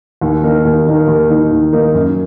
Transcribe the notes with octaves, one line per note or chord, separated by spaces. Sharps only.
D#2
D#3 A#3 D#4 A#4
D#2
D#3 A#3 D#4 A#4
D#2
D#3 A#3 D#4 A#4
D#2
D#3 A#3 D#4 A#4
F#2